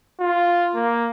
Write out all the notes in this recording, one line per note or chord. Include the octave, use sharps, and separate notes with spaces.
F4
A#3